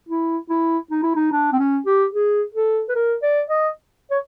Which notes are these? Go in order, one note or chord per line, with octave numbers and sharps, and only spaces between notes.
E4
E4
D#4
E4
D#4
D4
C4
C#4
G4
G#4
A4
B4
A#4
D5
D#5
C#5